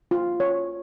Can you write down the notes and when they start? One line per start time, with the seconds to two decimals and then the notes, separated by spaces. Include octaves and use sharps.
0.11 F4
0.40 C#5